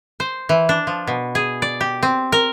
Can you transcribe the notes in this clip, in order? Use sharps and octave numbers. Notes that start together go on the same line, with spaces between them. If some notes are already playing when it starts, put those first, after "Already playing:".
C5
E3
D4
F3
B2
G#4
D5
G4
C4
A#4